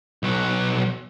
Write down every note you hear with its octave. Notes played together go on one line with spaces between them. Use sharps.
B1 F#3